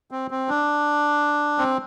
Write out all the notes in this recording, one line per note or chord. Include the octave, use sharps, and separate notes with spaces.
C4
C4
D4
C4